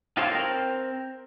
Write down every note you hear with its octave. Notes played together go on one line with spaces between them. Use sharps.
D#4 F4 G4 A4 C5 C#5
C4 A#4